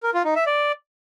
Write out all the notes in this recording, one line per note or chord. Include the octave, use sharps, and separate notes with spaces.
A#4
F4
D#4
E5
D5